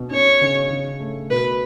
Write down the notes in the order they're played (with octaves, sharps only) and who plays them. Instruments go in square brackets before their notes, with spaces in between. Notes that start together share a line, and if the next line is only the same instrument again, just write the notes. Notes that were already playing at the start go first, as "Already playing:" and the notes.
Already playing: [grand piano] B2
[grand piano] C#4 [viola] C#5
[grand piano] C#3
C#3
A3
[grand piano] B2 [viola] B4